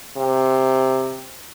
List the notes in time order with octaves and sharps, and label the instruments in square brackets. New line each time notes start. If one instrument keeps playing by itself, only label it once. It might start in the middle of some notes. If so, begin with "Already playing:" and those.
[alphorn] C3